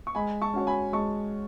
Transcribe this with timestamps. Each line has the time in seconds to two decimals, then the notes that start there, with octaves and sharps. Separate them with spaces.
0.07 C#6
0.15 G#3 G#5 B5
0.42 A5 C#6
0.54 C#4 F#4 C#5
0.67 G#5 B5
0.93 G#3 A5 C#6